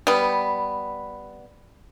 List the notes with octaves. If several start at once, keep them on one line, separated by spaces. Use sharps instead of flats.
G3 B3